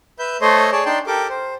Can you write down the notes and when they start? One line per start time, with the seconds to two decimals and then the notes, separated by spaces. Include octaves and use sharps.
0.19 B4 E5 G6
0.41 A3 A4 C5 C#5 D#5 C6
0.72 G#4 C#5 D5 A5
0.86 D4 D#4 D5 G5 A5 C6
1.07 G4 A4 A#4 D6
1.29 C5